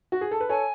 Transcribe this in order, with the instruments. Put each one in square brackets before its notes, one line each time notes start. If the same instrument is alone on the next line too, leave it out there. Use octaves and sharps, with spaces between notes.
[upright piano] F#4
G#4
A4
B4
[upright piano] A4 C#5 [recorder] G#5